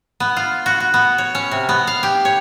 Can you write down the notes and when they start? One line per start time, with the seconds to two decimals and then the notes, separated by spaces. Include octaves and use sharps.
0.20 B3
0.36 F4
0.66 F#4
0.80 F#4
0.94 B3
1.18 C#5
1.35 C#4
1.51 C3
1.69 B3
1.87 F5
2.03 G4
2.25 C#5